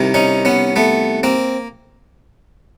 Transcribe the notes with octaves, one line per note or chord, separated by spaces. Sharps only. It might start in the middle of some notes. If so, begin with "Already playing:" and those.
Already playing: C2 C3 D#3
C#4 D#4
B3 C#4
A3 B3
A#3 C4